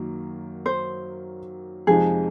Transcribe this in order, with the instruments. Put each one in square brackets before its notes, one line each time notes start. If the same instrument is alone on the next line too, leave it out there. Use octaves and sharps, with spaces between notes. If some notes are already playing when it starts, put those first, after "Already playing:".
Already playing: [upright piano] F#2 D#3 F#3 A#3
[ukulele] C5
[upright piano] F2 C3 F3 G#3 D#4 [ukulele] G#4